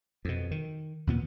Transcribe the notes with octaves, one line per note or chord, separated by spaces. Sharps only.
F2 B2
D#3
D#2 A#2 B3